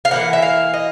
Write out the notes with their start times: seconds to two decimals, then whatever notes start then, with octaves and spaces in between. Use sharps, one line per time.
0.05 F5
0.11 G3 A#3 F#5
0.16 E3
0.33 E5
0.42 F5
0.74 D#5